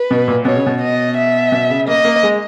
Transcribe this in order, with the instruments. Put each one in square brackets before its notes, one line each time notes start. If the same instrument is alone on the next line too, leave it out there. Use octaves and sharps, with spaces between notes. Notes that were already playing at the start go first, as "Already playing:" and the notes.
Already playing: [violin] B4
[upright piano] B2
A#2
[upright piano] B2 [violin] C#5
[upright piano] C#3
B2
[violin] D#5
E5
[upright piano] B2
C#3
[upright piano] A#3 [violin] D#5
[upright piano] A#3
G#3